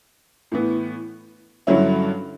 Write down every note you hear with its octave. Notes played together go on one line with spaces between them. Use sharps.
A2 E3 B3
G2 D3 F#3 C#4 E4